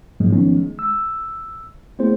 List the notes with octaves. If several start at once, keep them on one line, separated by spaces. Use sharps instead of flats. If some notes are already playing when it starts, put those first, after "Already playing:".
G#2 F3 F#3 G#3 A#3
D#3 F3 B3 C#4 D#4
G#3
E6
A3 B3 C4 E4 G#4 C5